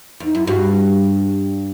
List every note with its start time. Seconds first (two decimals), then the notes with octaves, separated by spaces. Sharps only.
0.20 E2 D#4
0.35 F#2 E4
0.47 G2 F#4